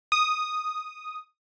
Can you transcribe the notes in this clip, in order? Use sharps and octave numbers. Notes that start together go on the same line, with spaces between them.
D#6